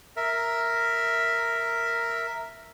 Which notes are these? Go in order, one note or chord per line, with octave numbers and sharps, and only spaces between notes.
A#4 E5